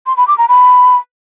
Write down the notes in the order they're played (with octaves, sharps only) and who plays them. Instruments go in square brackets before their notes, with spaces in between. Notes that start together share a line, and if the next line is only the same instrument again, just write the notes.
[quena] C6
B5
D6
A#5
B5